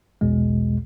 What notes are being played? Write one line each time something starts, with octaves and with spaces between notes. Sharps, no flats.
A#1 E2 B2 G#3